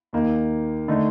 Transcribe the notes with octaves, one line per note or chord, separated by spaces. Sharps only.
D#2 D#3 A#3 D#4
D3 A3 D#4